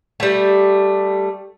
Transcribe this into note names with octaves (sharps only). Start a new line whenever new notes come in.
G3 A3